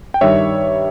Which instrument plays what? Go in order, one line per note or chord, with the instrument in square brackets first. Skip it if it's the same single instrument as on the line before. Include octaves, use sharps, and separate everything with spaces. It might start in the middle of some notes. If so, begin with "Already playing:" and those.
[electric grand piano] G5
G2 D#3 G3 C#5 E5